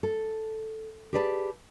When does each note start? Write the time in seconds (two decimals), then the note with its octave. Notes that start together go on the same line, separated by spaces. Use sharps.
0.03 A4
1.13 G4 G#4 B4 D5 G#5 A5